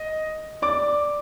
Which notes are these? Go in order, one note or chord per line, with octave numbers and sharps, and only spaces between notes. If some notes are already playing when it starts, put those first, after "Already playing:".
Already playing: D#5
D5 D6